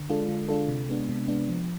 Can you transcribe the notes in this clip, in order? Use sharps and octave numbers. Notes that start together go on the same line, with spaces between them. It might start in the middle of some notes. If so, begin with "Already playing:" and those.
Already playing: D3
G#3 D4 F4 A4
D3
G#3 D4 F4 A4
C3
G#3 B3 D4
C3
G#3 B3 D4
F3